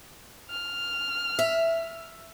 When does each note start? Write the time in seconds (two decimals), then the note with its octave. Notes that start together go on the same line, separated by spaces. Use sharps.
0.50 F6
1.39 E5